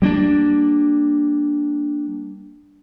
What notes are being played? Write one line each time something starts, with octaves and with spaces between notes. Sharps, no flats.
G3 A#3 B3 D4